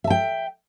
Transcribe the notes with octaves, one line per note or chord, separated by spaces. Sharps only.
E5 G5 A5